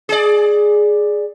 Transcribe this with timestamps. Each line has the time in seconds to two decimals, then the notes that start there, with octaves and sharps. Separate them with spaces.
0.09 G#4 D5